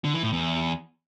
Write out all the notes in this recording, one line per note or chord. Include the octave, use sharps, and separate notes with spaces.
D3
E3
A2
E2